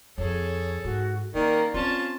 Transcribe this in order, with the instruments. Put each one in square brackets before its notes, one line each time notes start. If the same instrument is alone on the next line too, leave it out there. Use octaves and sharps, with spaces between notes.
[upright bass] F2 [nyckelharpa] G#4 A4 [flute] C#5
[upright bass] G#2 [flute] F#4
[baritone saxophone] D#3 [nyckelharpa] A#3 [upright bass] C#4 [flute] D5
[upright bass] C4 [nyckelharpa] C#4 A5 [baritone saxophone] F4